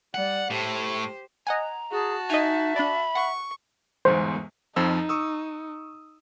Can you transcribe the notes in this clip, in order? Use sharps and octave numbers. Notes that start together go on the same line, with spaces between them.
G3 D5 F#5
A2 G4 C5
D#5 F#5 G#5 A#5
F#4 G#4 A5
D#4 D#5 E5 G#5
D4 D5 B5
F#5 C#6
G1 E2 G#2 C5
F2 F3 D#4 E6
C#6 D#6 E6